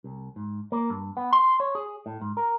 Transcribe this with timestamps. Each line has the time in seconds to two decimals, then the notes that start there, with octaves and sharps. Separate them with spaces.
0.04 C2
0.36 G#2
0.72 A#3
0.90 G2
1.17 B3
1.33 C6
1.60 C#5
1.75 G#4
2.06 A2
2.22 G#2
2.37 A#4